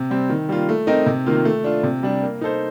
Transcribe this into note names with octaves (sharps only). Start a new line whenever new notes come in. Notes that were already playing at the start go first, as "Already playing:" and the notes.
Already playing: C3
G3 C4
D#3
G3 A#3 F4
A3
C4 D#4 A#4 D#5
C3
D#3 A#3 F4
A3
D4 F4
C3
G3 D4
A#3
D#4 A4 C5